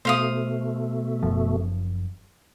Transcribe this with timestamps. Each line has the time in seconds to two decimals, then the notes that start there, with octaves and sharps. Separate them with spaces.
0.05 B2 A3 C5 F5 D#6
1.23 F#1 F#2 F3